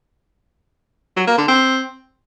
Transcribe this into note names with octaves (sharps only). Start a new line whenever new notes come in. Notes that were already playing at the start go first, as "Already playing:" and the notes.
F#3
A#3
D3
C4